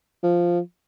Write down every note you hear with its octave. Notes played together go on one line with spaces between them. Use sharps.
F3